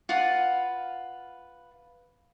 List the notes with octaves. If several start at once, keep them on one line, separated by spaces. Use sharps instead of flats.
F4 B4 F#5 B5